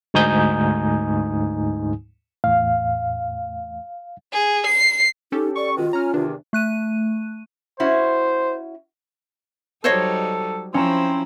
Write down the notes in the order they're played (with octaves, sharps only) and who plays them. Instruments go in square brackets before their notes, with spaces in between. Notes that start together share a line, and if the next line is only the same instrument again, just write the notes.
[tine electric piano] D2 G#2 D#4 G#5 D#6 G6
[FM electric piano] E2 A2 [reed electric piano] F5
[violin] G#4
C7
[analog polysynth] C#4 G4 A4 [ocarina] D#4
[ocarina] D5 [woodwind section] C#6
[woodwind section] B2 D#3 G#3 [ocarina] F4
[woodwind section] C#4 [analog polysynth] A#5 F6
[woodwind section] E2 C3 D#3 [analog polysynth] D4
[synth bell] A3 F#6 D#7
[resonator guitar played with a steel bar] C#4 E4 F#4 [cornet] C5
[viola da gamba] F#3 G3 D#4 [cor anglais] A4 [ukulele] C5 C#5 D#5
[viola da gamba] F3 E4 [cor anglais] C4 [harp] C#4 A#5 E7